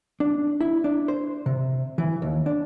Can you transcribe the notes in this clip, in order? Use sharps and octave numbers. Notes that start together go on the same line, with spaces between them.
D4
E4
D4
C5
C3
E3
D#2
D4